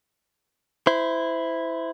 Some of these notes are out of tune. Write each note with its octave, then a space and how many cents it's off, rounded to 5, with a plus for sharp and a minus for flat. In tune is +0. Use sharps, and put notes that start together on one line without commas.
E4 +0 C5 -25